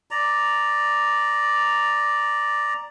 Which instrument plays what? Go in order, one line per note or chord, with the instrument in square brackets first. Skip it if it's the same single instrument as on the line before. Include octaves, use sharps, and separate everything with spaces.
[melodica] D5 A#5